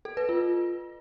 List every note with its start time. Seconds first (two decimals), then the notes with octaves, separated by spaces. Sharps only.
0.05 A4
0.17 B4
0.29 F4